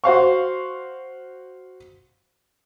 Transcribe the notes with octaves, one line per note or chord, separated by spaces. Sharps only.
F#4 C5 F5 C#6